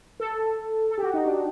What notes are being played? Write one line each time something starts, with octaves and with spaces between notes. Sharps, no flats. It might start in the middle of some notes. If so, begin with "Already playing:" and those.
A4
A4
G4
F#4
D#4
D4